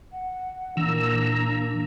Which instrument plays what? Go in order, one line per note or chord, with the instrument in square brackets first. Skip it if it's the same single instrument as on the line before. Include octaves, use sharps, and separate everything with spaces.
[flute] F#5
[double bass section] A#2 A#3 [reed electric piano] E3 [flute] D4 [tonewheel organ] A#5 E6